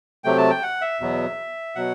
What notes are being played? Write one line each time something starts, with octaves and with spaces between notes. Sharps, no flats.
C3 F#3 A3 G5
A5
G5
F#5
E5
E2 B2 F#3 B3
B2 F#3 F#5